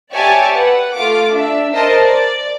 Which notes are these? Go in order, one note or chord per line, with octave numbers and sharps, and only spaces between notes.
G4 C#5 D5 E5 G#5 A5
B4 F#5
A3 F4 D6
D4 E5
A#4 C5 D#5 A5
D5